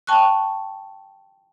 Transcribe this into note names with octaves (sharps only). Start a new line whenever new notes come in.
G5 A5 C#6 F#6